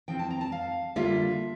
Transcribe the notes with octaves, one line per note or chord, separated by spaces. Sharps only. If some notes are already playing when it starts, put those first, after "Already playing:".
F3 C4 E4 G5
A5
A#5
A5
F5
D3 G3 A#3 F4 E5